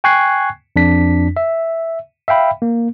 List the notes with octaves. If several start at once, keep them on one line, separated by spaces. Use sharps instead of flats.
G5 G#5 C#6 F#6 G#6 C7
F2 D4 B6
E5
E5 F5 G5 B5
A#3